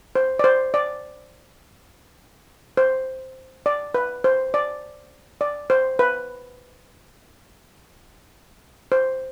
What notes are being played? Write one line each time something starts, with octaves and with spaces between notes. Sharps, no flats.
C5
D5
C5
D5
C5
D5
B4
C5
D5
D5
C5
B4
C5